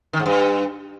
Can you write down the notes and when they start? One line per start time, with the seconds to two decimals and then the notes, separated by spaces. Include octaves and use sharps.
0.13 D#3
0.20 G#2
0.26 G2